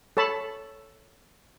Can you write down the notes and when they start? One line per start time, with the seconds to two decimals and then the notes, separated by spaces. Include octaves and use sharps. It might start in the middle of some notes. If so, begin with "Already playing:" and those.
0.17 A4 C#5 A5 B5